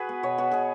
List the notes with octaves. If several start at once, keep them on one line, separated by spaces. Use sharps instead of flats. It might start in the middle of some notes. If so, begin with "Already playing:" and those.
Already playing: F#4 G#4 B4
B3
B2 C#5
B3 F#4
B2 G#4